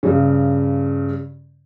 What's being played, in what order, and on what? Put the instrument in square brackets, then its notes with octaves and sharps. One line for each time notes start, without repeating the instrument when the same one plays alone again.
[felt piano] G2 C#3